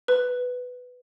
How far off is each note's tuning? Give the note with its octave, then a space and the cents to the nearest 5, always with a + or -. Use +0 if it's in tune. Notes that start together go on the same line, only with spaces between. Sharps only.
B4 +10